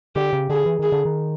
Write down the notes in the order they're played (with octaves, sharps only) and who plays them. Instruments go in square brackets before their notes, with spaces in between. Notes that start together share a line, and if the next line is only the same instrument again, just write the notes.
[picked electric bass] D3 [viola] G4
[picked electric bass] C#3
[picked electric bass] D3 [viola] G#4
[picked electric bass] E3
[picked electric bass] D#3 [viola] G#4
[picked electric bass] D3
D#3